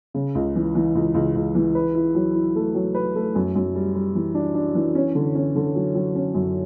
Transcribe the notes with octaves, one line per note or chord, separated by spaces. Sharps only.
C#3
C#2
E3
E3
C#2
C#2
C#2
E3
B4
E4
F#3
E4
A3
F#3
B4
A3
F#2
F#2
G3
G3
E3
D4
D4
E3
C#4
D3
C#4
D3
F#3
F#3
C#4
F#2